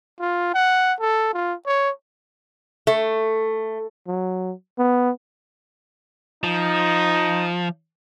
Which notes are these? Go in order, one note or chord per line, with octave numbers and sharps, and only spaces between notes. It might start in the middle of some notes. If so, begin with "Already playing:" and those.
F4
F#5
A4
F4
C#5
A3
F#3
B3
F3 D#4